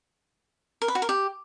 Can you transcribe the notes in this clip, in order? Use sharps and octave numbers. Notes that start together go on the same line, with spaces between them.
A#4
B4
F#4
A#4
G4